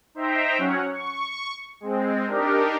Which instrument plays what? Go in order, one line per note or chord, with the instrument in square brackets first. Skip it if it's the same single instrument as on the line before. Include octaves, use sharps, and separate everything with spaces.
[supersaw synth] D#4 C5 E5 G5 A#5
F#3 C#4 C#5 F#5
C#6
G#3 C4
D4 D#4 G4 A#4